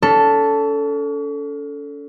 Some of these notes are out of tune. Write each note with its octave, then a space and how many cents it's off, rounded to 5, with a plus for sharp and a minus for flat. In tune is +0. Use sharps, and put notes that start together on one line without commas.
C#4 +40 A4 +0